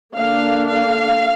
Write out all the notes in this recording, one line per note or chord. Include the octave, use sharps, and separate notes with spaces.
D3 A#3 D4 F5
F5